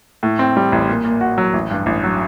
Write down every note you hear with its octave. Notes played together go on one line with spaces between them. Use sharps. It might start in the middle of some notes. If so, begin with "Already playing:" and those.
A2
C4
G3
A1
A#2
A#2
F#4
F#3
A1
G2
A1
F#3